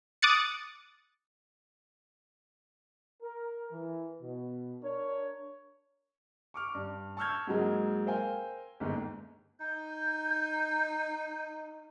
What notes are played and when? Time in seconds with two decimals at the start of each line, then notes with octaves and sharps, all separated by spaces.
0.22 D6 D#6 F#6 A6 C#7
3.22 A#4
3.71 E3
4.21 B2
4.82 D4 A#4 C#5
6.54 C#6 D6 F6
6.75 G2
7.17 A5 C#6 E6 F6 G6 G#6
7.47 G#2 F#3 G#3 A#3
8.06 A#4 C5 F5 G5 G#5
8.80 G1 D#2 G#2
9.60 D#4 G6